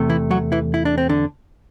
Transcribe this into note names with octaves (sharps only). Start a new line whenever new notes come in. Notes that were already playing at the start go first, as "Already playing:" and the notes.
Already playing: E2 C3 A3
E3 E4
F#3 F#4
E3 E4
E4
D4
C4
D3 D4